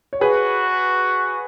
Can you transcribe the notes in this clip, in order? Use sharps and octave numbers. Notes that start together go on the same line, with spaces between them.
C#5
F#4 G#4 B4